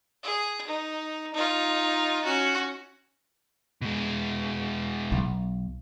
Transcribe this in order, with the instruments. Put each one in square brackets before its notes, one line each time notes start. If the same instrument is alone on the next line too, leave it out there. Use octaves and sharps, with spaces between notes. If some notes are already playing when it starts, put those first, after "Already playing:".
[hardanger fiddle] G#4
D#4
D#4 F4
C#4 F#4
[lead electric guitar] B2 G#3
[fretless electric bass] B1